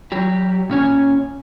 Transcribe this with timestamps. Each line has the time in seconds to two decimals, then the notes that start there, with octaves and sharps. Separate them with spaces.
0.12 F#3 G4
0.70 A#2 C#4 C#5 G#5